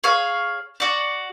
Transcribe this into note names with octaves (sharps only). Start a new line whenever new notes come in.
G#4 C#5 F5
F#4 D5